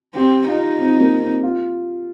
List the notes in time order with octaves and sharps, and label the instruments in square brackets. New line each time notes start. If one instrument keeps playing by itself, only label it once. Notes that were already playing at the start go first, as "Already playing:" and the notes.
[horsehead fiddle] C4 [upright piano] G4
[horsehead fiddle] D#4 [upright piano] F4
[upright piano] C4
A#3
C4
F4